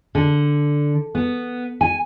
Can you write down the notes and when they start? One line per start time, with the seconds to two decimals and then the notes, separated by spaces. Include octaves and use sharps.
0.15 D3
1.15 B3
1.81 G#5